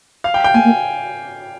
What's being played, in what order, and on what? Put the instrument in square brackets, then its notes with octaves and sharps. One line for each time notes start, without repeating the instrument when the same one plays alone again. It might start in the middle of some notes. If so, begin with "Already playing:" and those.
[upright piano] F5
G5
G5
[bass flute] A#3 [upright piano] G#5
[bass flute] A#3